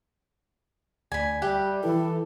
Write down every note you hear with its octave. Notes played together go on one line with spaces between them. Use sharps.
D2 D5 G#5 B5
G3 G4 E5 F#6
E3 E4 A4 B4